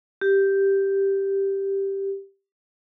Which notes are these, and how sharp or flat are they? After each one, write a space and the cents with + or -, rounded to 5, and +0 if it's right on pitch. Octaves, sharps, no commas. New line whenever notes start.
G4 +0